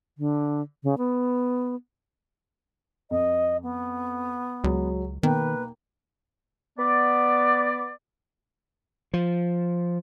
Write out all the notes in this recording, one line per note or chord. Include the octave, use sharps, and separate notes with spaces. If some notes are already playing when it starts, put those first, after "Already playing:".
D3
C#3
B3
F2 D#5
B3
C#2 F#3 G#3
B1 D#3 A#3 B4 G5
B3 D5
F3